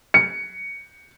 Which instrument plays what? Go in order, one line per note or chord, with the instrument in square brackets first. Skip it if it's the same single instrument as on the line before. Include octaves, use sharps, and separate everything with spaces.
[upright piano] C#7